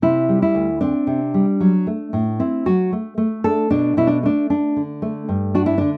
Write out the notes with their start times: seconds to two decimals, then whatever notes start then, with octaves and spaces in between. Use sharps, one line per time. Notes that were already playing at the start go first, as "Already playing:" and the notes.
0.02 C3 E4
0.29 G3
0.42 E4
0.55 D2
0.81 C4 D4
1.07 C3
1.34 G3
1.60 F#3
1.87 A3
2.13 A2
2.39 C4 E4
2.66 F#3 F#4
2.92 A3
3.18 A3
3.44 D4 A4
3.70 B2 D4
3.97 B2 E4
4.07 D4
4.23 A3 D4
4.50 D4
4.76 D3
5.02 A3
5.28 G2
5.54 D4 F#4
5.66 E4
5.78 D3 D4